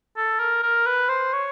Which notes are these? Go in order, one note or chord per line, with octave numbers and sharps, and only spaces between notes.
A4
A#4
A#4
B4
C5
C#5